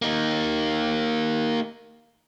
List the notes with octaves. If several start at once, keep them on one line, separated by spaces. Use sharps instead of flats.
A#3 D#4